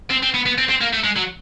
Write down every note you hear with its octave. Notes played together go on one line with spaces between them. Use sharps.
C4
C4
B3
B3
C4
C4
A#3
A3
G#3
F#3